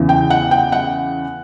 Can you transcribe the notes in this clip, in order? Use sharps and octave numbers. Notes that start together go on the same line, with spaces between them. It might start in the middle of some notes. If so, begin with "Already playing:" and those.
Already playing: E2 C#3 E3
G5
F#5
G5
F#5